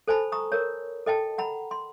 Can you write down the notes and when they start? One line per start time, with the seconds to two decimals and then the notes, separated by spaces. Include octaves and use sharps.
0.08 A4 C5 G#5 A5 B5
0.32 A#5 C#6 D#6
0.52 A#4 C#5
1.06 A4 D#5 G5 A5
1.38 F#5 A#5 B5
1.71 C6